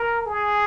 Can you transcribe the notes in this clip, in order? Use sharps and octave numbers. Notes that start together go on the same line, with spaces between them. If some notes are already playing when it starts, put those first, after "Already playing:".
Already playing: A#4
G#4